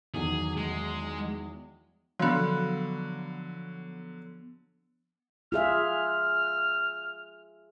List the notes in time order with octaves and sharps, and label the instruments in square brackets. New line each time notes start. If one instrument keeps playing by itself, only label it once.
[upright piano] E2 D#3 F#3 [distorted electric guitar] G#4
[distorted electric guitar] G#3
[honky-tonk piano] D3 F#3 [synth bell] F3 B3
[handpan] F4 G#4 E5 [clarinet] F6